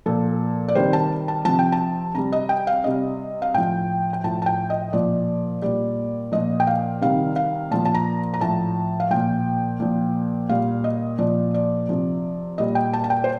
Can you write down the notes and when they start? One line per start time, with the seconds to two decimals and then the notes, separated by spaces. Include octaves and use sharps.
0.06 A#2 F3 A4
0.68 D5
0.75 C3 D#3 G3 C5
0.93 A5
1.28 A5
1.45 C3 F3 A5
1.59 G5
1.72 A5
2.14 C3 G3 A#5
2.32 D#5
2.49 G5
2.67 F5
2.84 C3 G3 D#5
3.42 F5
3.54 A2 F3 G5
4.13 G5
4.24 A2 F3 A5
4.42 A5
4.46 G5
4.70 D#5
4.93 A#2 F3 D5
5.62 A#2 G3 D5
6.32 A#2 F3 D#5
6.60 G5
6.67 F5
7.01 C3 D#3 G3 F5
7.36 F5
7.71 A#2 F3 A5
7.85 A5
7.95 A#5
8.34 A#5
8.40 A2 F3 A5
9.00 F5
9.10 A#2 F3 G5
9.80 A#2 F3
10.49 A#2 G3 F5
10.84 D#5
11.19 A#2 F3 D5
11.54 D5
11.89 C3 F3
12.58 A#2 G3 D#5
12.75 G5
12.93 A5
13.04 A5
13.10 G5
13.24 C5